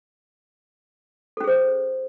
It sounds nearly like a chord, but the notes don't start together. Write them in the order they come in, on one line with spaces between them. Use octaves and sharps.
A4 C#4 G#4 C5